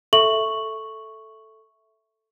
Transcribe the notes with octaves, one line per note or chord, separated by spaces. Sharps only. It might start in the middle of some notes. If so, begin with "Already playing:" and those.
A4 E5 C#6 F#7